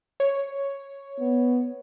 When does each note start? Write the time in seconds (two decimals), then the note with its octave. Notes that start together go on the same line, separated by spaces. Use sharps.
0.20 C#5
1.20 B3